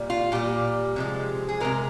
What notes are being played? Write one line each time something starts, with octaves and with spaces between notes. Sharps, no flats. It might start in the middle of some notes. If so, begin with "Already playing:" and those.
Already playing: A#2 G3
F4
A#2 G3 G4
C3 F3 G#3
G#4
C3 F3 G#3 A#4